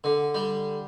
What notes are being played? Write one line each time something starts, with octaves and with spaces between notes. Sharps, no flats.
D3
G3